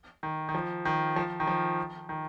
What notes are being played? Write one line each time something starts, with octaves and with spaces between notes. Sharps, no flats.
D#3
D#3
F3
D#3
F3
D#3
F3
D#3